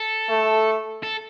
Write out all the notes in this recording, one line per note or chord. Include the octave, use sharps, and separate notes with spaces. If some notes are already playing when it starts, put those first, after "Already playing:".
Already playing: A4
A3
A4